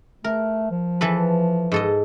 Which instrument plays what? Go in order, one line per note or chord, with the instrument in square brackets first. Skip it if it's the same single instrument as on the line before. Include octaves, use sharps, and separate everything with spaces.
[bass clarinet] A3 [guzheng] A#4
[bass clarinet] F3
[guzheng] E3 A4 B4
G#2 A4 D#5